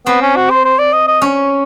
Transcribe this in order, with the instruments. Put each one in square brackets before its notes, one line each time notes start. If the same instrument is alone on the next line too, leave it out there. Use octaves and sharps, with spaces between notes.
[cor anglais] B3 [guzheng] C4
[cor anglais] C#4
F#4
C5
C5
D5
D#5
D#5
[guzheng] C#4